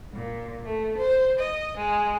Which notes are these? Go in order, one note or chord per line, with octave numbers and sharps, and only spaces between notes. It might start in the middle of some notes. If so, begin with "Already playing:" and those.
A#2
A3
C5
D#5
G#3